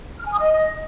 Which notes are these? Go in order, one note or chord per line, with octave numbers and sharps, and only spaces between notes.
F6
G#5
D#6
D#5